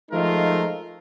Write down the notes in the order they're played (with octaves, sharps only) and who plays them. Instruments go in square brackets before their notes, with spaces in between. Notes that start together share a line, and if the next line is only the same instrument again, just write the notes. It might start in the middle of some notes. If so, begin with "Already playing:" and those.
[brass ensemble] F3 G#3 A3 D#4 F4 A#4